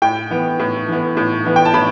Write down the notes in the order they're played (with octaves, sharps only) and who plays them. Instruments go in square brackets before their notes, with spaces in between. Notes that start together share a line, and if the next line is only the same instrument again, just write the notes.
[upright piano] A2 G5
E3 B3
A2
E3 B3
A2
E3 B3
G5
A5
A2 B5